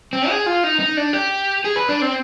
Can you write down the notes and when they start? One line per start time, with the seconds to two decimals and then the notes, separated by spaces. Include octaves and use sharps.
0.13 C4
0.29 G#4
0.46 F4
0.64 D#4
0.80 D#4
0.97 D4
1.13 G4
1.64 G#4
1.76 B4
1.89 D4
2.02 C4